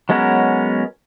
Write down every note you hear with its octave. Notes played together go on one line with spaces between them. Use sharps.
F#3 G#3 B3 C#4 A#4